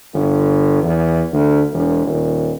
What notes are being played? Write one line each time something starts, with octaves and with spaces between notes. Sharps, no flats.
G1
E2
D2
E1
D#1